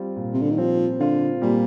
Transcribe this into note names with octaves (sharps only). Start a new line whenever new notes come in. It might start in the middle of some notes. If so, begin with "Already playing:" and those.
Already playing: G3 C4 F4
A#2
C3
D3
D#3
F3 C4
D3 F4
A#2 G3